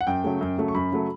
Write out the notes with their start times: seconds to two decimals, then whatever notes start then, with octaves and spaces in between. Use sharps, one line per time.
0.01 F#5
0.07 F#2 G5
0.24 C#3 F#3 A3
0.41 F#2
0.58 C#3 F#3 A3
0.68 C#6
0.75 F#2 B5
0.92 C#3 F#3 A3